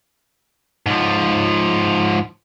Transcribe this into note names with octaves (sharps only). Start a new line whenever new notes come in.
G#2 F3